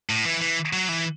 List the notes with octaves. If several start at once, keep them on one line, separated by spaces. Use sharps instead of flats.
A2
E3
E3
F#3
E3